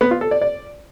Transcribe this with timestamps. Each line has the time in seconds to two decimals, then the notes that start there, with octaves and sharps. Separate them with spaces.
0.01 B3
0.11 F4
0.21 A4
0.31 D5
0.41 D5